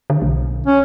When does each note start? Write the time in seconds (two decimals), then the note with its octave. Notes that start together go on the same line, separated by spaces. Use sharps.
0.10 D3
0.22 B1
0.66 C#4